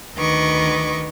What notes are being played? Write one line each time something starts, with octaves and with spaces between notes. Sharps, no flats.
D2 D#3 B4 D#5 C#6 D6